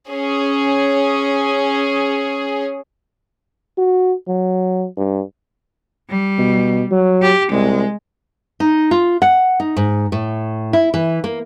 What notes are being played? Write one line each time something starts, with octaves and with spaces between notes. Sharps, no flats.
C#4 G#4
F#4
F#3
G2
G3
B2
F#3
G4
C2 G#3
D#4
F4
F#5
D#4
G#2
A2
E4
E3
A#3